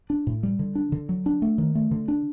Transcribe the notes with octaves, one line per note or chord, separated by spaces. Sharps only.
D4
A2
G3
D3
D4
D3
F#3
D4
A3
D#3
A3
D3
D4